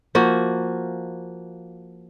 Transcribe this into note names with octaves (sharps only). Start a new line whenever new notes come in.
F3 A#3 F#4